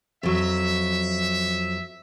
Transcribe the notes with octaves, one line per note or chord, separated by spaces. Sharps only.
F2 F#3 E5